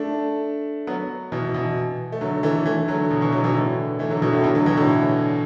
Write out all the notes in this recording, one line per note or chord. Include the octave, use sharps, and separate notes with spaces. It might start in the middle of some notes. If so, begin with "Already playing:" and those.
Already playing: A3 D4
F#3 B3
B2 E3
B2 E3
A3
D3 F#3
E3 A3
E3 A3
D3 F#3
B2
B2 E3
D3 F#3
B2 E3
A2 D3
E3 A3
D3 F#3
B2 E3
A2 D3
B2 E3
D3 F#3
B2 E3
A2 D3